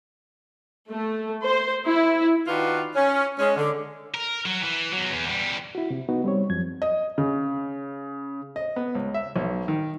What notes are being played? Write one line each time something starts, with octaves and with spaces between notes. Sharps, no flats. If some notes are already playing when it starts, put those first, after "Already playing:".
A3
C5
E4
D#3 D4 F4 F#4 B4
C#4
G#3 C#4
D3
A#4
F#3
E3
E2 F#3
E2
E2 G3
E4 F#4
C3
B3 D#4 F#4
G3 C4 C#5
F#2 F3 G#6
D#5
C#3
D#5
B3
C#2
E5
B1
D#3